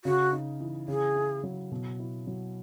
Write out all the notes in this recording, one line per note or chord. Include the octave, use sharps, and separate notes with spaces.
C#3 F#4
D#4
E3
C#3 G#4
E4
F#3
B2
E4
F#3